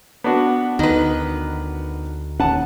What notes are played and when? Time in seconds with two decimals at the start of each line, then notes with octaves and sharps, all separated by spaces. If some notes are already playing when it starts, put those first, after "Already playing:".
0.24 B3 D4 F#4
0.79 D2 D#3 B4
2.40 D1 D#2 C#4 F#5 A5